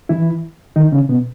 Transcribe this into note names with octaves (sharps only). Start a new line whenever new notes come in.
E3 E4
D#3 D#4
C#3 C#4
B2 B3